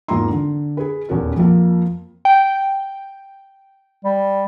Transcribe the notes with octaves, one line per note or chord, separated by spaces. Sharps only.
G#1 E2 A#3 F4 A#5 C6
D3
G#4 B4
D#1 E2 C#4 F#4 A#4
F2 F3 A#3
G5
G3